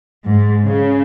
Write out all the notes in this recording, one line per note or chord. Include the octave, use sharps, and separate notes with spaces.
G#2
C#3